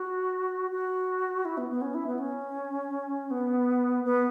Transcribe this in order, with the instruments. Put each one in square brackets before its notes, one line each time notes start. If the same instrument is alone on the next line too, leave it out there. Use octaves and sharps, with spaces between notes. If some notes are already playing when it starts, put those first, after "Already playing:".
Already playing: [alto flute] F#4
F#4
E4
B3
B3
C#4
E4
B3
C#4
B3
B3